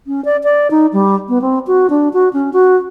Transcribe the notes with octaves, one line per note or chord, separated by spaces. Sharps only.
C#4
D5
D5
D#4
G3
B3
C4
F#4
D4
F#4
C#4
F#4